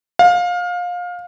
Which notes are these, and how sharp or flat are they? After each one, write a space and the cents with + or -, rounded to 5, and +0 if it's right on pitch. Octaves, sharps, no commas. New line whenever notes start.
F5 +25